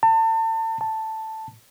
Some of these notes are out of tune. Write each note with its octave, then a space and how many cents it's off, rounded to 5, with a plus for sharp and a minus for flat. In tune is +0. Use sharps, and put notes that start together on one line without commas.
A5 +35
A5 +5